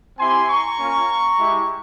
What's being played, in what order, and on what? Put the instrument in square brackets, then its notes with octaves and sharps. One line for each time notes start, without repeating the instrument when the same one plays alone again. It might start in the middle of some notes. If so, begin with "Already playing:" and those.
[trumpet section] C4 E4 G4 G#5 C6
A#5 C#6
A#3 C#4 F4
G#3 E4 G4